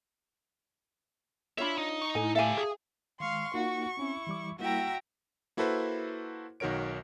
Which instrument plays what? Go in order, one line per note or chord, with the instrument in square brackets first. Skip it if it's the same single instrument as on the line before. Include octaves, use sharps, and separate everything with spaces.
[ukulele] D4 F4 C#5 [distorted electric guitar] E5 B5
[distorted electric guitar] D#4
[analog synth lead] C#6
[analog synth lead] A2 [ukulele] G#5
[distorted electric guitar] G4 A4 [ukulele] E5 F5 G#5
[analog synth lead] G#4
[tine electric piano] D#3 G#3 [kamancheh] F5 C6 [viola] C#6
[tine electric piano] A#3 D#4 F4 [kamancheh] F#4
[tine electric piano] C4 C#4 [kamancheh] E4
[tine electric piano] E3 G3 D6
[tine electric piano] G3 A#3 E4 [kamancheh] F#4 G5 [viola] E5 A#5
[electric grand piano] A#3 E4 F#4 A4 B4 C5
B1 D#3 F#4 A#4 C#5 D7